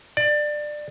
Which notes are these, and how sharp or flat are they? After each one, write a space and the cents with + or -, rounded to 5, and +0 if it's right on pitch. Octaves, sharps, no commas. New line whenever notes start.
D5 +20